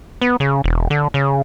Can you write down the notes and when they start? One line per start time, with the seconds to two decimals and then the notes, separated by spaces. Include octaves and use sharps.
0.21 B3
0.40 C#3
0.64 E1
0.90 D3
1.14 C#3